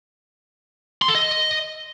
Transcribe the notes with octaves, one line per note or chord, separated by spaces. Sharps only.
C6
A4
D#5